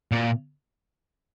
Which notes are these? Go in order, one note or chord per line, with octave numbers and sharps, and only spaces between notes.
A#2